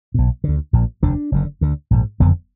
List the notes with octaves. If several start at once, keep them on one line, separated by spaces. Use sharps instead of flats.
B1 B2
D2 D3
A#1 A#2
F1 D#2 D3 D4
F#1 F#2 D3
D2 D3
A#1 G#2
F#1 F2 D3 B3